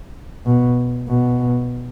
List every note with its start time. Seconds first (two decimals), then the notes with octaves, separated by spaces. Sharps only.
0.46 B2
1.08 B2